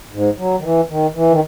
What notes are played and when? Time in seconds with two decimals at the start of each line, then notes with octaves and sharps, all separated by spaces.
0.12 G#2
0.38 F#3
0.59 D#3
0.63 E3
0.89 D#3
1.15 E3
1.29 D#3